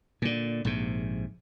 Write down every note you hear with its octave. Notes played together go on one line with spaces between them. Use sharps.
A#2 D3
A#1 G#2 C3